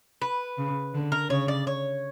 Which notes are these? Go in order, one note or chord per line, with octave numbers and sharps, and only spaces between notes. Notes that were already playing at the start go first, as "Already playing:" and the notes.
B4
C#3
D3
A#4
C#3 C#5
D5
C#5